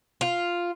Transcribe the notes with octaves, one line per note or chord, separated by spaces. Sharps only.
F4